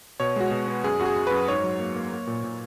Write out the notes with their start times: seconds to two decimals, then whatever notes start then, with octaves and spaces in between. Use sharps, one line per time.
0.20 B2 C#5
0.36 G#3 F#4
0.51 B2
0.67 B3
0.84 F#2 G#4
0.99 F#2 F#4
1.05 G#4
1.16 F#2
1.27 F#2 B4
1.48 G#2 C#5
1.64 F#3
1.79 A#3
1.96 A#3
2.12 A#3
2.27 A#2
2.44 A#2